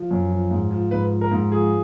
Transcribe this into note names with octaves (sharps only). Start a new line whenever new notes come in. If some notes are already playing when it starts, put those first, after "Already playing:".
Already playing: F3
F#2
F3
G#2
F3
G#2 B4
F3
A#4
G#2
F3 G#4